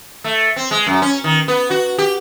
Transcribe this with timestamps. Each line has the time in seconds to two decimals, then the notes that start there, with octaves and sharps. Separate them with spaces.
0.24 A3
0.56 C4
0.71 G#3
0.87 F#2
1.02 C#4
1.24 D#3
1.48 B3
1.71 F#4
1.98 G4